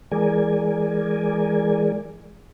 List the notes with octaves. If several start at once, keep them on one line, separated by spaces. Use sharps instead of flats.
E3 G#3 G#4 A#4 D5 G#5